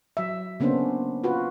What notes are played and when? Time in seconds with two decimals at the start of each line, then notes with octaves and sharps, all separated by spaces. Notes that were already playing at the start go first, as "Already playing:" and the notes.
0.17 F#3 E5
0.60 C#3 A#3 B3 C#4 D4 C5
1.24 F4 F#4 B4